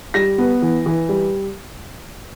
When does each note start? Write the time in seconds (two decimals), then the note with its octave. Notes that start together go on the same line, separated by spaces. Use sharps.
0.14 G3 A#6
0.38 B3
0.62 E3
0.86 E3
1.09 G3